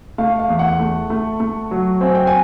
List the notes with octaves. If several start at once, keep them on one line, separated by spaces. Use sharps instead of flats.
A3 F5
F5
E2
F#5
A3
A3
A3
F#3
C4 G#5
G5
G#5